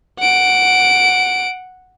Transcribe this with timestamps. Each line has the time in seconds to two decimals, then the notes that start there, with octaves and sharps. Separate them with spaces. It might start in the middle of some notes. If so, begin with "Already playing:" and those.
0.19 F#5 D7